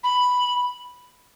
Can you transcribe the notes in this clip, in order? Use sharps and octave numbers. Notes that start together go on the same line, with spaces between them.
B5